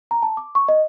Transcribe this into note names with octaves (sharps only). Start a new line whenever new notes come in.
A#5
A5
D6
C#6
D#5